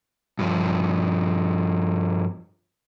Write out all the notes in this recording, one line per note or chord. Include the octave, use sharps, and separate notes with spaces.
G2 F3